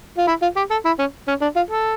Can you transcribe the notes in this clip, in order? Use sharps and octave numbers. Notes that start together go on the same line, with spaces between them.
F4
E4
F4
G4
A4
E4
C#4
C#4
D4
F4
A4